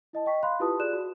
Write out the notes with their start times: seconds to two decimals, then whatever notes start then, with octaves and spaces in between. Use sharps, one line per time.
0.13 E4 D#5 A5
0.26 D#5 G5 C#6 B6
0.43 F5 B5 C6 F#6
0.60 E4 F4 G4 B4 A5 D#6
0.79 F4 G#4 D5 F#6 E7
0.93 F#4